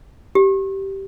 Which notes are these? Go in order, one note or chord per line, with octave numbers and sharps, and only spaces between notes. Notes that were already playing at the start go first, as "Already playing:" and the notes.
G4